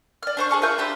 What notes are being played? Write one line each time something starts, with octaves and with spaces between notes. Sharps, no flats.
D5 F6
D4 C5 C#6
G#4 A5 C#6 F6
F4 A#4 E5 G6
D4 G4 C5 B5